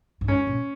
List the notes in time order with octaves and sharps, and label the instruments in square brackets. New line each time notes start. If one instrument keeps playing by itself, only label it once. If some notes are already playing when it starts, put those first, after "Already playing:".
[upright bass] G#2
[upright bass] F#2 [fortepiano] C#4
[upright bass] A#2